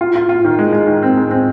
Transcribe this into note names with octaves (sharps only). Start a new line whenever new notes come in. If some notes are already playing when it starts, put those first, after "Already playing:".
F4
F4
F4
D#3
G#3
G#3
D#3
C4
G#3
C4